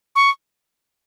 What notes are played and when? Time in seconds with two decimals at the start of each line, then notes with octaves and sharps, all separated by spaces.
0.16 C#6